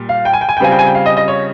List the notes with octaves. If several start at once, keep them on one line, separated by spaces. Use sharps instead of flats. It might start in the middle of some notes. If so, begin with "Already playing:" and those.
Already playing: A#2 G3
F5
G5
G#5
G5
G#5
G5
C#3 G3 C4 F4 G#5
G5
G#5
G5
F5
D#5
D#5
C#5